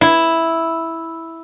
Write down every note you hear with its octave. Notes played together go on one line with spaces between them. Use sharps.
E4